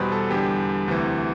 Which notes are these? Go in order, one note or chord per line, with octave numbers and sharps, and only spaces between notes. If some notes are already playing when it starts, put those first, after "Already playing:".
Already playing: E2 B2 G3 B4 C5
A4
E2 D3 G3 G4
D2 C3 E3